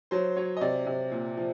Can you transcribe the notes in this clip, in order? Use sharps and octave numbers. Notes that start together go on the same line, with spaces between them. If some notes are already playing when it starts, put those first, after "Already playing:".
F#3 C5
F#3 C#5
D#5
C3 D5
C3
A#2
F3